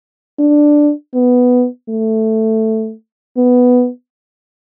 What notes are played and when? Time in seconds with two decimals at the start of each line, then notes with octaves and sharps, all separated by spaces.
0.40 D4
1.15 B3
1.89 A3
3.37 B3